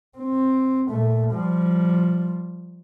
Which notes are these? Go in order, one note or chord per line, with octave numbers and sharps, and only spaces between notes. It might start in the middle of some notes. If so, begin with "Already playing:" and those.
C4
A#2 A3
F3 G3